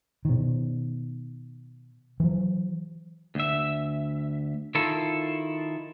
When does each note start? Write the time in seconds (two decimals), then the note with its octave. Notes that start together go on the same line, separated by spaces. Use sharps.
0.25 B2 D#3
2.20 E3 F#3
3.35 D2 E5
4.75 D#3 E4 F4 A4